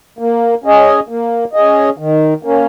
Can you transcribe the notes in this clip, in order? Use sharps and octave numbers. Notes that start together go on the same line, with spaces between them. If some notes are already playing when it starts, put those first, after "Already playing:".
A#3
C#4 G#4 D#5
A#3
C#4 G#4 D#5
D#3
A#3 C#4